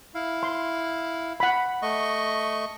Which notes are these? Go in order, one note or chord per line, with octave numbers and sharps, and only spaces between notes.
E4 F5
C6
F#5 B5
A3 D#5 C#6